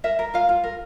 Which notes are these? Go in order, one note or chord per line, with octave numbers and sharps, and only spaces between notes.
A#4 E5
A#4
F4 F5
F4
A#4